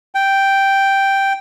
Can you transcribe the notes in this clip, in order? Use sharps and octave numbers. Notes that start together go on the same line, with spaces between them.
G5